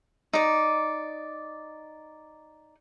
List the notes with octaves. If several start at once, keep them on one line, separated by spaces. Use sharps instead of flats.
D#4 D5